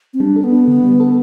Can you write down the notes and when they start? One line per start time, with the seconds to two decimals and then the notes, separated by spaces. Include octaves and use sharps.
0.14 C4
0.20 G3 D4
0.36 A4
0.44 B3
0.52 D4
0.68 D3
0.84 G3
1.00 A4